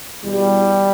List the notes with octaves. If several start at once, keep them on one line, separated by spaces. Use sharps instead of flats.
E2 B2 G3